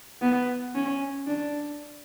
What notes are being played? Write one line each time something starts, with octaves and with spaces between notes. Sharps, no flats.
B3
C#4
D4